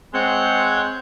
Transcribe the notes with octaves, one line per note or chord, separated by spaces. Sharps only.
G#3 C4 C#5 F#5 G6